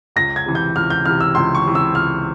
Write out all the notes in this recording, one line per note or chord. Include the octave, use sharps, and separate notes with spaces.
C#2 A#6
G#6
C3 E3
G6
C#2 F6
G6
C3 E3 F6
E6
C#2 C6
C#6
C3 E3
E6
C#2 F6